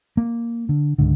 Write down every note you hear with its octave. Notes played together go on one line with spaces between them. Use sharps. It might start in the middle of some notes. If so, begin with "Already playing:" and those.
A#3
D3
C#2 G#2 D3